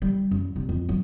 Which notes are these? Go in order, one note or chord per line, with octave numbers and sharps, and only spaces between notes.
G3
F#2
C2
F2
F#3